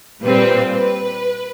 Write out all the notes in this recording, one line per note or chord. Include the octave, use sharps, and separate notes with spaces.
A#2 G3 C4 B4
B4